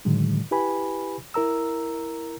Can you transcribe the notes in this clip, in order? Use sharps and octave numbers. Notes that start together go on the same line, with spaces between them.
A2 D3 D#3 F#3 G#3
E4 G4 B4 G#5 B5
E4 A#4 A#5 E6